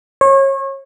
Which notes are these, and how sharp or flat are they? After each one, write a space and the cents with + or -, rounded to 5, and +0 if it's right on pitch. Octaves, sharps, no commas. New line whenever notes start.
C#5 -30